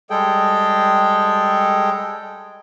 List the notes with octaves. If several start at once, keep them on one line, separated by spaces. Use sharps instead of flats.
G3 G#3 G#4 A4 G5